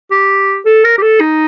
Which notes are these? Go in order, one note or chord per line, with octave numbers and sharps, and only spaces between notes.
G4
A4
A#4
G4
A4
D#4